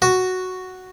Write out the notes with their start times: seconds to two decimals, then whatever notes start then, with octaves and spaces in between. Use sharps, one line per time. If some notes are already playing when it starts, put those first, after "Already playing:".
0.02 F#4